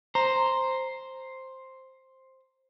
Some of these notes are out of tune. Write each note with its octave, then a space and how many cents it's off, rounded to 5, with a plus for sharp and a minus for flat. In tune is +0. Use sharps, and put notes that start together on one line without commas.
C5 +5 A#5 +0